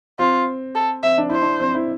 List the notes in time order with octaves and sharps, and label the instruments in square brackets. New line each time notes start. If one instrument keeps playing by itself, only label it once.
[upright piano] C4 [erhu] F4
[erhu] A4
[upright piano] C4 [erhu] E5
[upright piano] D4
[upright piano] E4 [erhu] C5
[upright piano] D4
C4
E4